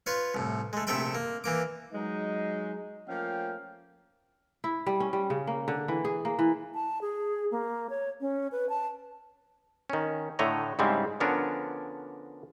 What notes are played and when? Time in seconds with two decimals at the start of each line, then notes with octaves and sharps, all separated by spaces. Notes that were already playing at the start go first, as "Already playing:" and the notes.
0.06 F4 B4 C#5 F5
0.34 C2 A2
0.73 G#3 A3
0.87 A#1 C3 A3 E5 G5 B5
1.15 A#3
1.44 E3 A#3 D6
1.93 F#3 G#3 D#4
3.08 F3 A3 A#3 C#4 F5 G5
4.64 E4
4.86 G3
5.00 C#4
5.13 G3
5.30 C#3
5.47 A#3
5.68 D3
5.88 E3
6.05 G#4
6.25 A#3
6.39 E3
6.74 A5
7.01 G#4
7.51 A#3
7.90 C#5
8.21 C#4
8.52 B4
8.69 A5
9.90 D#3 C#4
10.39 A2 D3 A3 C#5 D#5 A#5
10.79 G#2 C#3 G3 G#3 C4 E4
11.20 D3 F3 B3 C#4 D4 A#4